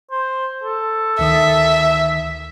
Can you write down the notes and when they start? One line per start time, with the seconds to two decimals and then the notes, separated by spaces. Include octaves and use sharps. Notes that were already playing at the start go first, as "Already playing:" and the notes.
0.11 C5
0.64 A4
1.19 D2 D#3 E5 D#6